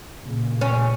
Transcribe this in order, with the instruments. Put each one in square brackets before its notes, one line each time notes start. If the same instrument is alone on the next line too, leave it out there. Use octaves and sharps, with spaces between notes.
[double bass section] A#2 C#3
[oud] C#4